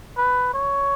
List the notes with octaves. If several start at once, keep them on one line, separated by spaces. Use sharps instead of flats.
B4
C#5